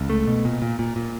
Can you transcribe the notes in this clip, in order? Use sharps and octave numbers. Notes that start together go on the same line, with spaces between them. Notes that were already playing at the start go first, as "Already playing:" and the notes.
Already playing: C#2
A3
B2
A#2
A#2
A#2
A#2